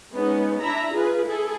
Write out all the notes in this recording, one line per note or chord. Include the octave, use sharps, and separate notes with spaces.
G#3 B3 C#4 D#4
D4 E4 E5 A#5 B5
F4 G#4 B4
E4 G#4 A4